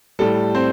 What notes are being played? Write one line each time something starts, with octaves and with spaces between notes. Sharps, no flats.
A2 G3 A4
C4 C5